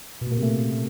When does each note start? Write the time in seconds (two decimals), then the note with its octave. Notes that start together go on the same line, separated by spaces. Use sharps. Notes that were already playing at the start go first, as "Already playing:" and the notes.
0.21 B2
0.27 A#2
0.32 A#3
0.37 C3
0.43 A3